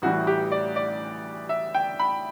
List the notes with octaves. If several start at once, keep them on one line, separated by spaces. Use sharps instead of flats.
A1 A2 E3 G3 F#4
G4
D5
D5
E5
G5
B5